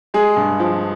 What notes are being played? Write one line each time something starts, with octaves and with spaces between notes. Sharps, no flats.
G#3 G#4
G2
F3